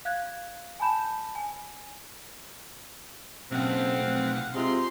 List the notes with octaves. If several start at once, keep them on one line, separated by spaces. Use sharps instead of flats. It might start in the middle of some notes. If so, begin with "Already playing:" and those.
F5 F#6 G#6
G#5 A5 B5 G6 E7
G#5
F#1 B1 C4 F5 F#5
F1
C3 G#3 C4 F4 C6